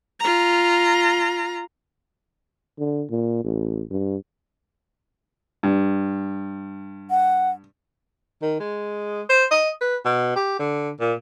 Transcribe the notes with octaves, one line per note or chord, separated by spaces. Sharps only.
F4 A#5
D3
A#2
A1
G2
G2
F#5
D#3
G#3
C5
D#5
B4
B2
G4
D3
A#2